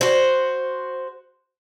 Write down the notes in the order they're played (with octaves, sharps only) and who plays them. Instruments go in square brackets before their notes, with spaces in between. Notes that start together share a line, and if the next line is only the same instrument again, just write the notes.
[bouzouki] F#4 C5